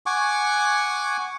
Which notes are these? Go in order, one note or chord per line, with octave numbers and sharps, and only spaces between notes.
F#5 G#5 C#6 D6